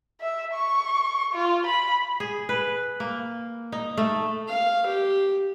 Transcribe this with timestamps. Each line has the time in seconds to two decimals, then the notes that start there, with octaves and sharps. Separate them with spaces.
0.20 E5
0.53 C#6
1.33 F4
1.67 B5
2.20 G#4
2.49 B4
3.00 A#3
3.72 D#4
3.97 A3
4.48 F5
4.86 G4